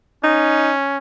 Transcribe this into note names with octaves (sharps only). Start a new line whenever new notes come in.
C#4 D#4